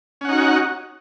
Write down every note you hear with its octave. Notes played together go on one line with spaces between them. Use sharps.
C#4 D#4 F#4 F#5